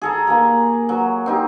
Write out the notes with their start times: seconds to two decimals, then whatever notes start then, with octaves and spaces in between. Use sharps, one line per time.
0.01 G#4 A4 A#5
0.27 A#3 G#5 A#5
0.89 F#3
1.26 C4 D#4 G4